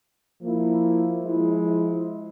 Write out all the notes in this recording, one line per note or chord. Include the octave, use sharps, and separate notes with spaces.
F3 A#3 E4
F3 G#3 E4